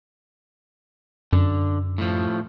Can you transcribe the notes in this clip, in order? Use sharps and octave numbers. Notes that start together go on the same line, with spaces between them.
F#2 D3
A2 F3